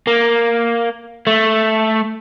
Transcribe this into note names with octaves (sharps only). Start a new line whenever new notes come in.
A#3
A3